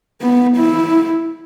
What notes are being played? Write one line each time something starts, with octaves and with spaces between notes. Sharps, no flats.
B3
E4